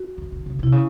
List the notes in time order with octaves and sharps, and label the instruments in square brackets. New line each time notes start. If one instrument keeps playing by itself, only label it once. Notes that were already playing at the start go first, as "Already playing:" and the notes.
Already playing: [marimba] F#4
[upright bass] D#3
D#3
C#3
[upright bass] C3 [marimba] E4
[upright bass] C#3